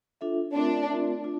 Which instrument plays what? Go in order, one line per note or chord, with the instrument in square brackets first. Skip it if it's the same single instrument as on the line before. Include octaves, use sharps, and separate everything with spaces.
[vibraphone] D4 F4 A4 E5
[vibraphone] A3 C4 F4 A#4 E5 [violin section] D4
[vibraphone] A3 C4 F4 A#4 E5
D4 F4